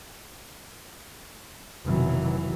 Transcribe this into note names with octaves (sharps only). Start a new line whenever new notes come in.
F1 B2 D#3 E3 F#3